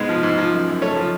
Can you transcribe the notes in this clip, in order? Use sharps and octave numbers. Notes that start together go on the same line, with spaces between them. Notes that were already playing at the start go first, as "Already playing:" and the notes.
Already playing: G#2 G#3 B3
F3
G#2
F3
F#2
F#2
A3 C#5
F3